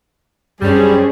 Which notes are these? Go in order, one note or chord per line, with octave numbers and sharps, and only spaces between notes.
F#2 G3 C#4 D4 G#4 C5